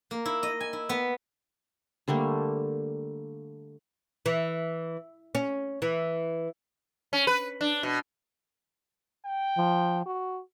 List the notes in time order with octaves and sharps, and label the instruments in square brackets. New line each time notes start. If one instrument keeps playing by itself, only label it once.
[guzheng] A#3
E4
D#5
G#5
E4
B3
[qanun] D3 G3 A3 A#3
[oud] E3
C#4
E3
[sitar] C#4
B4
D4
B2
[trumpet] G5
[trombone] F3
F#4